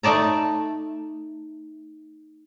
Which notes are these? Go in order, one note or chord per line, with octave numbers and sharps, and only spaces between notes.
A3 D#4 D5 A5 A#5